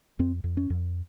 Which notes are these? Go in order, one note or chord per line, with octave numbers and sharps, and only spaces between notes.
F2 C4
F2
C#4
F2